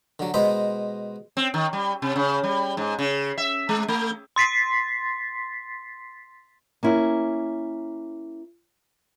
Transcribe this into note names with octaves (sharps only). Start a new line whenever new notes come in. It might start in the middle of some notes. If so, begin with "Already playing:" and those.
D3 F#3
B2 G#3 C5 D#5 A#5 B5
C4
D#3
G3
C3
C#3
G3
G#2
C#3
E5
G#3
A3
C6 A6 B6 C7
A#3 C#4 E4